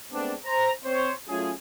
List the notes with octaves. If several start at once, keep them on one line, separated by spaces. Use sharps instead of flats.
G#3 A3 B3 C4 D4
C5 A#5
C4 C5 C#5
F#3 A3 C#4 F4 G#4